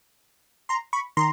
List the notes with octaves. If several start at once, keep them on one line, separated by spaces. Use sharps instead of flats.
A#5 C6
B5 C#6
D#3 A#5 C6